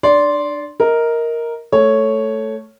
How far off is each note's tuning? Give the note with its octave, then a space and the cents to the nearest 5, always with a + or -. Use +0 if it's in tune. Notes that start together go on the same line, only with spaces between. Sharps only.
D4 +30 D5 -20 C6 +0
A#4 +0 D#5 +25
A3 +0 C#5 +0